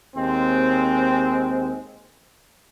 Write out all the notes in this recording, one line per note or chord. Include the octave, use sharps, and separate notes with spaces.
D#2 G#3 C4